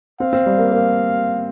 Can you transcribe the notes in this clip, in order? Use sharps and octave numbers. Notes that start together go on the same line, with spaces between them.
C4 F5
C4
G3
A#3
A#3